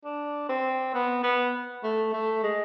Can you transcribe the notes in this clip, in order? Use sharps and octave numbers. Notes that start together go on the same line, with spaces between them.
D4
C4
B3
B3
A3
A3
G#3